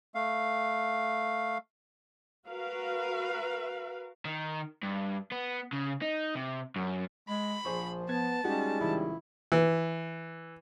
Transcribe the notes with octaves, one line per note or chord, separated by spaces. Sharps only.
A3 F5
F#4 A#4 B4 F5
D#3
G2
B3
C#3
D#4
C3
F#2
G#3 B5
A#1 F3 G#4 C5 C#6
B3 A5 G#6
G3 G#3 C#4 D#4 F#4 G4
A1 A#2 C#3 E4
E3